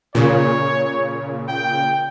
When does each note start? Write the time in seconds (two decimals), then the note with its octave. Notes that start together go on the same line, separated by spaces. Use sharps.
0.15 A#2 C#3 C#5
1.48 G5